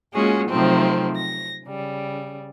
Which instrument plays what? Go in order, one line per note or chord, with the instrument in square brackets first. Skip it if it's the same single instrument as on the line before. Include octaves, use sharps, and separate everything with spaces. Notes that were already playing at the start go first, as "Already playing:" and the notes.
[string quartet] G#3 A#3 C#4 F4 F#4 G#4
C3 D#3 F3 F#3 A3 C4
A#6
C#3 G3